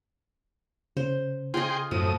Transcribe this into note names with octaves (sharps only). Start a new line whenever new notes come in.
C#3 C5
F4 G#4 D#5 G5 C6
F#2 A2 F3 D#6